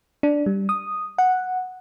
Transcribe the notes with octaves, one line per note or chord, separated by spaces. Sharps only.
D4
G3
D#6
F#5